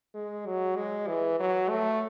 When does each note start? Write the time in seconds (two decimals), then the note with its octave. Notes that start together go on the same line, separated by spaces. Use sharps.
0.15 G#3
0.47 F#3
0.76 G#3
1.08 E3
1.39 F#3
1.69 A3